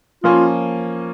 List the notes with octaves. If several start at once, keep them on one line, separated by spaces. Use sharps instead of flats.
F3 A#3 C#4 F4